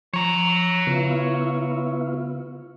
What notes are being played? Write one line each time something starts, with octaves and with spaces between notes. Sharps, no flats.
F3 C#5 A#5
C#3 B3 E4 F4